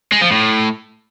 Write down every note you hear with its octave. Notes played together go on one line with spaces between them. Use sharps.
G#3
F3
A2